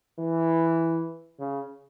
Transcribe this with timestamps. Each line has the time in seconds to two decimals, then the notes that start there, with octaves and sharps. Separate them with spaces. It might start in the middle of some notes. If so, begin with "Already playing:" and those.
0.19 E3
1.39 C#3